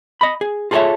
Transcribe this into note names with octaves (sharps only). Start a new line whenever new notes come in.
D#5 B5
G#4
F4 G#4 A4 C5 C#5 E5